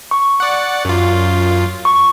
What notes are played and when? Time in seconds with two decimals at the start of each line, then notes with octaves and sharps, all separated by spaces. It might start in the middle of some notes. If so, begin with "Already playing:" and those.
0.11 C#6
0.40 D5 F#5
0.85 F#2 F4
1.85 C#6